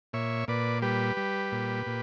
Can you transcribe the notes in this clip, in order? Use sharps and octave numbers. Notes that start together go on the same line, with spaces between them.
A#2 C#5 E5
A#2 B4 D5
G3 G4 B4
G3
A#2
A#2